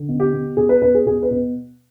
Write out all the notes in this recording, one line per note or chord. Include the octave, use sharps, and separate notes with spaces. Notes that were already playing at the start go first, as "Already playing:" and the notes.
Already playing: D3
B2
G4
B2
B2 G#4
B4
B2 B4
G#4
B2 G#4
B4
B2